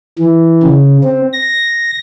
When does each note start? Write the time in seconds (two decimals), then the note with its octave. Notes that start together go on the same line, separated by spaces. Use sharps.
0.19 E3
0.64 C#3
1.03 C4
1.33 A#6